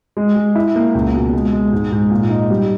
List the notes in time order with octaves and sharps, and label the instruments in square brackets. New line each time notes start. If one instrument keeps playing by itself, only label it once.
[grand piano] G#3
G#3
E4
A#3
C#2
B2
G#3
G#3
G#2
G#2
A#2
D#4
G3